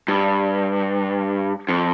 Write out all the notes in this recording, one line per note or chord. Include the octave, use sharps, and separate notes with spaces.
G2
F2